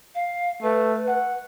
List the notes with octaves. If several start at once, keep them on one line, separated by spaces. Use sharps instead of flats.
F5
A3 B4
F#5